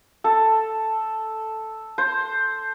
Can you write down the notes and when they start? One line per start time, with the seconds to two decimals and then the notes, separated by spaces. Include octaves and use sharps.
0.24 A4
1.98 C5